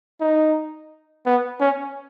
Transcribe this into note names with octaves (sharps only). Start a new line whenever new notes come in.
D#4
B3
C#4